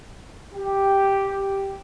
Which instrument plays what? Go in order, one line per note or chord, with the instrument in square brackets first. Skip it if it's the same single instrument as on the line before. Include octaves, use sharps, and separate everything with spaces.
[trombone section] G4